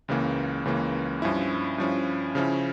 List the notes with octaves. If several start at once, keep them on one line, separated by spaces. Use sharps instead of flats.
C#2 C#3 E3 A#3
C#2 C#3 E3 A#3
G2 F3 C#4 E4
G2 F3 C#4 E4
C#3 F3 C#4 E4